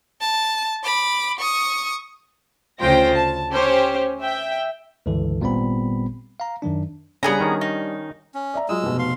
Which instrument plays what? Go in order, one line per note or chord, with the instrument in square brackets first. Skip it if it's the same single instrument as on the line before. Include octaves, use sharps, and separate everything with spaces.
[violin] A5
B5 D6
C#6 D#6
[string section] D2 C#3 F4 C5 G5 A#6
A5
C#4 G4 C5
E5 G5
[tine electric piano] C#2 G2 D3 E3 A4
G#1 A#2 G3 B3 C4 B5
F5 A#5
F#2 D#3 F#3 D4
[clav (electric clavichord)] C#3 [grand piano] G3 D4 [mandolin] B3 G#4 A#5
[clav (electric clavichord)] D#3 C#4
[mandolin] D#4
[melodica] C#4
[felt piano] D5 E5 A#5
[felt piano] F#3 F4 D#6 [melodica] G#3 E6
[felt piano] F1 B2
[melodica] F5 C6